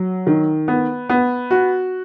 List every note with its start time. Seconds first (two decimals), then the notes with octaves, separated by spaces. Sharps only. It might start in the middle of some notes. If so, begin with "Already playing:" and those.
Already playing: F#3
0.27 D#3
0.68 B3
1.09 B3
1.51 F#4